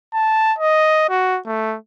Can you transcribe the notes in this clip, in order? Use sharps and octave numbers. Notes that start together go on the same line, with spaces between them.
A5
D#5
F#4
A3